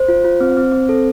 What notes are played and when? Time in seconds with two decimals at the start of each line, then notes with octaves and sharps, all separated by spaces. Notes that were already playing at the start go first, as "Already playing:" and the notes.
Already playing: C5
0.08 F4
0.24 F4
0.41 C4
0.57 C4
0.72 C4
0.89 A4